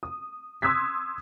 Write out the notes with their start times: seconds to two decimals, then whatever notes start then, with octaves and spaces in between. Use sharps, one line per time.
0.03 D#6
0.62 C6 D#6 E6 F#6 G#6 B6